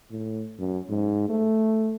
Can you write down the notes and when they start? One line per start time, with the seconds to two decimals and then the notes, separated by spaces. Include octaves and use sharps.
0.10 A2
0.59 F#2
0.89 G#2
1.29 A3